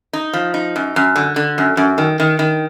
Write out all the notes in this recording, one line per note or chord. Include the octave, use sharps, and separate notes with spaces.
D#4
F3
D#4
F#2
F#2
D3
D3
F#2
F#2
D#3
D#3
D#3